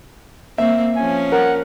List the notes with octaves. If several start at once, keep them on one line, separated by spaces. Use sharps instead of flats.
A#3 C4 E5
F3 C#4 G#5
A#4 F#5